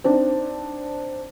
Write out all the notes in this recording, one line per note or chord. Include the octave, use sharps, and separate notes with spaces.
C4 D4 D#4